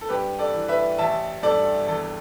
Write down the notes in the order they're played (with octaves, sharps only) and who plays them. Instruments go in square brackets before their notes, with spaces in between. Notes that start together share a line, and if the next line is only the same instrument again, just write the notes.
[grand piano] A4
G2 G4 B4
A4 D5
E3
B4 E5
A1 E5 A5
G2 A4 D5
E2 A4